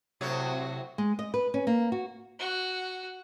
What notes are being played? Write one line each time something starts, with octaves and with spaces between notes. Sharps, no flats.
A2 C3 F#3 F#4 C5 C#5
G#3
D#5
B4
C#4
A#3
F#4
F#4